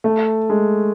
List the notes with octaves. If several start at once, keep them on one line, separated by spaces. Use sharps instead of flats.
A3
G#3